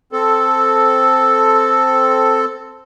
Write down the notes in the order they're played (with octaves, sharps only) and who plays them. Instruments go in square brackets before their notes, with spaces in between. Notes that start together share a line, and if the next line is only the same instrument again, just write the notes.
[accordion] C4 A4